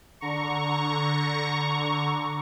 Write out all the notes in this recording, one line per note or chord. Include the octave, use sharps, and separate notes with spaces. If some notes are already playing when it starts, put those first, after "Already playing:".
D3 A#5 C#6